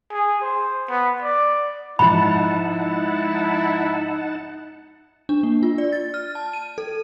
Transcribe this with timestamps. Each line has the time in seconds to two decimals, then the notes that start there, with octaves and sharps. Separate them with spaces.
0.12 G#4
0.41 C5
0.90 B3
1.22 D5
1.99 G#2 F3 D#4 E4 F#5 A5 B5
5.29 D4
5.43 A#3
5.63 F4
5.78 D5
5.92 A6
6.14 F6
6.35 A5
6.53 D#7
6.78 A4